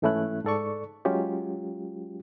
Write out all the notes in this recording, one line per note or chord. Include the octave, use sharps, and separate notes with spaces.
G#2 E3 A3 C#4 E4 F#6
G#2 A4 D5 C#6
F#3 G#3 C#4 F4 G4